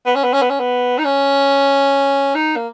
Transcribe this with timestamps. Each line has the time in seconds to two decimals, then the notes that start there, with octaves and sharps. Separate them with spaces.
0.06 B3
0.15 C#4
0.24 B3
0.33 C#4
0.42 B3
0.50 C#4
0.59 B3
0.98 D#4
1.04 C#4
2.35 D#4
2.56 A#3